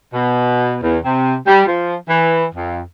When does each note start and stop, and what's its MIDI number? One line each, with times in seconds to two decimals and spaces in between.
0.13 0.76 47
0.82 0.97 40
1.04 1.34 48
1.46 1.63 55
1.66 1.94 53
2.08 2.45 52
2.54 2.81 41